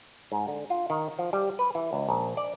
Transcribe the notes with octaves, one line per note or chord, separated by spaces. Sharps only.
G#2
D3
F4
D#3
F3
G3
B4
E3
C#2
A#1
D5